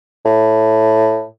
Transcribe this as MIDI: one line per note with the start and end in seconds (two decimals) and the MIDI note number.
0.25 1.24 45